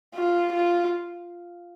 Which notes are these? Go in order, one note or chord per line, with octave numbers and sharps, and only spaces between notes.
F4
F4